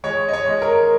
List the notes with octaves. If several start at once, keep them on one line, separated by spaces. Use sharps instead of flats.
G#3 C#5
D#5
C#5
G#3
A#4